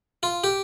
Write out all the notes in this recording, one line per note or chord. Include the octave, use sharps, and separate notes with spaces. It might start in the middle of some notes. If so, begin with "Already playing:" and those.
F4
G4